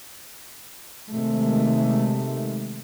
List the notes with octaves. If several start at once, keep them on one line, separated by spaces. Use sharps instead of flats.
C3 D#3 G#3 A3